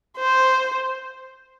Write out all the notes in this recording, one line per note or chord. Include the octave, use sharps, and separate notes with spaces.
C5